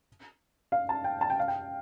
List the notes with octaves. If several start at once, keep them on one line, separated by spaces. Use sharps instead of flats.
F5
A5
G5
A5
G5
F5
G5